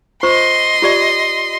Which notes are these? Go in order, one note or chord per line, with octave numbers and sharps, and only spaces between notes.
F4 C5 D#5 C6 C#6
F4 G4 D5